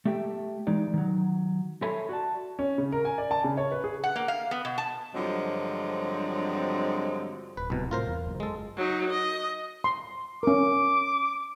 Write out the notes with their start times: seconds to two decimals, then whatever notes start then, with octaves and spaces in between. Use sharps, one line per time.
0.05 A3 G4 E5 G5
0.67 E3 G#3 D#4 D5
0.94 D#3 F#3
1.82 A4 C#5 E5 G#5 B5 C6
2.09 F#4 D5 A5
2.59 C#4
2.78 C#3
2.92 A#4
3.05 G#5
3.18 D5
3.31 A5
3.44 C#3
3.57 C#5
3.72 B4
3.84 G#4
4.04 F#5
4.16 A#3
4.28 F5
4.51 B3
4.65 B2
4.78 A5
5.14 G2 D3 F3 F#3 G#3 C4
7.57 D1 B4
7.70 C2 B2
7.91 A2 C3 F4 A#4 C5
8.07 E2
8.27 F#1 F#2
8.40 G#3 A4
8.77 F#3 D#4
9.10 D#5
9.84 C6
10.43 C#4 A#4 D6